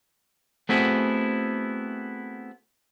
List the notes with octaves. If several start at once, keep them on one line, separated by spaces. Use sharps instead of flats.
A3 B3 C4 E4 F#4 G#4